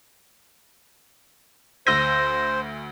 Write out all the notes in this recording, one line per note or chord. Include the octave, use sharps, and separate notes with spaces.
D2 C5 E6 G6 A#6 D#7